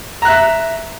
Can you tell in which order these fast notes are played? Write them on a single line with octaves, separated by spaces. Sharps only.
A#5 F#6 E5